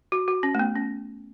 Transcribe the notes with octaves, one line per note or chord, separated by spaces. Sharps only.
F#4
F#4
C#4
A3
B3
C#4